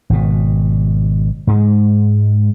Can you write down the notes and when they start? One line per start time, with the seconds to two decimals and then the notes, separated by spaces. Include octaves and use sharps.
0.10 G#1 B2
1.47 G#2 G#3